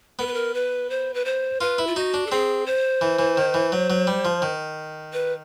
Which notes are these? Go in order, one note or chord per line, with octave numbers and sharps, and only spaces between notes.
B3 A#4
B4
A#4
B4
C5
B4
C5
F4 B4
E4
F4
D#4 F#4
D4
A4
C4 G#4
C5
E3
E3
D#3
E3
F#3
F#3
G3
F3
D#3
B4